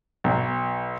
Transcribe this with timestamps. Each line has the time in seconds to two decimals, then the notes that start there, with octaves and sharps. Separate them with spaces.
0.24 B1